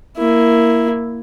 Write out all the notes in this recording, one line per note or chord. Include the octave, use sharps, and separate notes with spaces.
A#3 E4